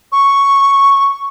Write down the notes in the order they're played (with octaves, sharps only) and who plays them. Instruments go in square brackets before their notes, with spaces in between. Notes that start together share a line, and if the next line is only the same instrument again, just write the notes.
[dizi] C#6